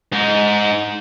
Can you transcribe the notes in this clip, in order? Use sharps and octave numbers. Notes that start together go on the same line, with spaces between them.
G#2 D#4